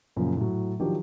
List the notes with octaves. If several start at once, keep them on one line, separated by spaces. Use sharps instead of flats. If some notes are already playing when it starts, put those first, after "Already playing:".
F#2 A#2 C#3 F3
A2 F#3
D#3 F3 F#3 D4 G4